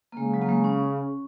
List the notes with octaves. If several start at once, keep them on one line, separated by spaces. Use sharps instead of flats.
A#3
C#3 G#3
F#3
A#3
G#3
C#4